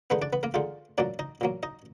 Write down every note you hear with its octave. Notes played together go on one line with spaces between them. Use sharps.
D3 G#3 B3 D#4 B4
D4 D5
B3 B4
A#3 A#4
D3 G#3 D#4 F4
A#2 F#3 A#3 D4 D5
D#4 D#5
A#2 F#3 A#3
D#4 D#5